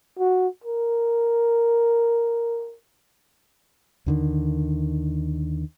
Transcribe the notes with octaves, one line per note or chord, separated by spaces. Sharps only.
F#4
A#4
D#2 D3 D#3